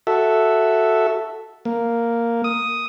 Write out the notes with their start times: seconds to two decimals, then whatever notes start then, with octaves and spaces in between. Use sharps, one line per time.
0.07 F#4 A4 E5
1.65 A#3
2.44 D#6